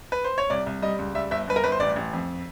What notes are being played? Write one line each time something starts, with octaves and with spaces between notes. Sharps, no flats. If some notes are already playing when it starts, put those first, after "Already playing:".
B4
C5
C#5
C2 D5
C2
G3 D#5
C#2
G3 E5
G1 E5
G1 B4
A#4
G1 B4
C5
A1 D5
A1
F2